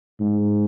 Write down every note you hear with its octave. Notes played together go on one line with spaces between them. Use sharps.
G#2